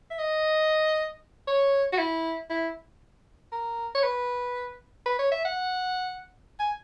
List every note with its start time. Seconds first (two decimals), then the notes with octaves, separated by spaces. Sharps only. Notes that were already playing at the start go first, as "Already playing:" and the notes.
0.11 E5
0.19 D#5
1.48 C#5
1.93 F#4
1.99 E4
2.50 E4
3.52 A#4
3.95 C#5
4.04 B4
5.06 B4
5.19 C#5
5.32 E5
5.45 F#5
6.60 G#5